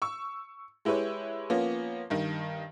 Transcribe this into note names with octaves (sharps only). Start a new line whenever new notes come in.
C#6 E6
G#3 E4 G4 B4 C#5
F3 A#3 B3 C#4
G2 D#3